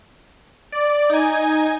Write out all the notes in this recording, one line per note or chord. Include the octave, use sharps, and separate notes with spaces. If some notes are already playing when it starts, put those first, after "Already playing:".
D5
D#4 G#5